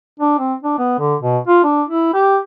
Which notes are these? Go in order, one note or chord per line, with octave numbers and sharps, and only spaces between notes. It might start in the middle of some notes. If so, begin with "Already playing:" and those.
D4
C4
D4
B3
D3
B2
F4
D4
E4
G4